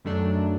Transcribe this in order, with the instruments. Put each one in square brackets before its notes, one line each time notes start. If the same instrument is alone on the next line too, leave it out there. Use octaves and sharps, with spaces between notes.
[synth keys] F#2 D#3 F#3 A3 D4